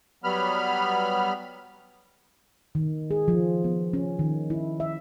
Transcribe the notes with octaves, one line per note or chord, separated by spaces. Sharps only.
F#3 G3 B3 B5 F6
D#3
G#4
F3
B3
C#4
D#3
E4
E5